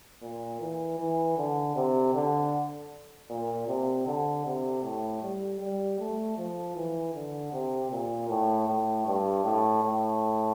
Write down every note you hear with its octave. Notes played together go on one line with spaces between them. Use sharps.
A#2
E3
E3
D3
C3
D3
A#2
C3
D3
C3
A2
G3
G3
A3
F3
E3
D3
C3
A#2
A2
A2
G2
A2
A2